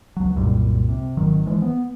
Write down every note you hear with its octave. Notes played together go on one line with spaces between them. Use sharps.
C#2 F#3
C2 F#2 A#2 G3
C3
G#1 D#3 F#3
E3 F3 G#3
B3